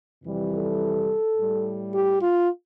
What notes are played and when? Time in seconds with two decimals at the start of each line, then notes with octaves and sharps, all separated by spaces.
0.24 F2 C3 E3 G3
0.52 A4
1.37 A2 G3
1.94 G4
2.22 F4